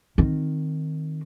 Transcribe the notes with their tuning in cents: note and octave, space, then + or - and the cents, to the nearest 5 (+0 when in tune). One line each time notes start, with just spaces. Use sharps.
D#3 -5 C4 +0